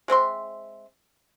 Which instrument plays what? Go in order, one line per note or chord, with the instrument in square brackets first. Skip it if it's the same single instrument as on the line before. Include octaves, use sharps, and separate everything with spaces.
[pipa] G#3 C4 E5 C6